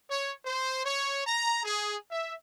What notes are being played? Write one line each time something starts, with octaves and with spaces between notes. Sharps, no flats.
C#5
C5
C#5
A#5
G#4
E5